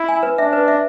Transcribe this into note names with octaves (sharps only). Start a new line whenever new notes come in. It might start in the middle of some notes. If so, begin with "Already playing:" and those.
Already playing: E4
G#5
B4
D4 E5
B4
E5